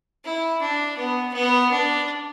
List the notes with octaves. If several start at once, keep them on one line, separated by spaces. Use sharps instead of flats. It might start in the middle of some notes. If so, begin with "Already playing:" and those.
E4
D4
B3
B3
D4